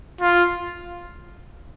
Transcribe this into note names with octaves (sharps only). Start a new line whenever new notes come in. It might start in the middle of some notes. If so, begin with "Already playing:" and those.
F4